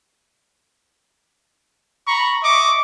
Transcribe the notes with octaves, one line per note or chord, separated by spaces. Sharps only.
A#5 B5 C#6
D#5 E5 C#6 D6